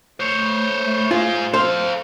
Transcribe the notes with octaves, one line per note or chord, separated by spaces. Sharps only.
A3 C5 C#5
F4 G#4 C5
A4 C5 F5